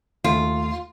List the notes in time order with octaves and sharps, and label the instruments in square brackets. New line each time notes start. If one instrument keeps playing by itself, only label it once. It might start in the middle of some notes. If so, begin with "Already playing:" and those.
[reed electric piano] D#2 A3 [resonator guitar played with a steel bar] F4